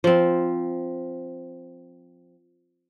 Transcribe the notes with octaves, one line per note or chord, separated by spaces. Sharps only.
F3 C4